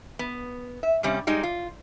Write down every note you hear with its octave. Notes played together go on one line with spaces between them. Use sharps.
B3
E5
G2 C3 G3 C#4
G3 G#3 D#4
F4